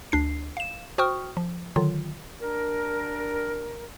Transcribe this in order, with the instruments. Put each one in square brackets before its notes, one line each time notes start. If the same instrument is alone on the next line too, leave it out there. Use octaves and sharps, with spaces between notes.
[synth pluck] D2 D4 C7
F5 E7
F#4 C5 G5 C#6 D#6 F6
F3
D3 D#3 F#3 F4
[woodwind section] G3 D4 A#4